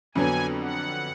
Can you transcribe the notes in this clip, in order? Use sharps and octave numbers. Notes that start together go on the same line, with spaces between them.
F2 D3 F#3 B3 D4 G#5
F#5